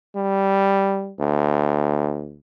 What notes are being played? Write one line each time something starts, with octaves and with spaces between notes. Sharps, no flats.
G3
D2